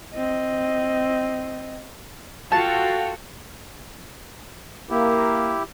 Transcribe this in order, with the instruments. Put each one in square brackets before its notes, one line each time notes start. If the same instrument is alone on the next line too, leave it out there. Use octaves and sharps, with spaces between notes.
[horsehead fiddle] C4 D#5
[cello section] F4 F#4 A4 [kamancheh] F5 G5 [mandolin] A5
[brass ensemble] A#3 [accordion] E4 G4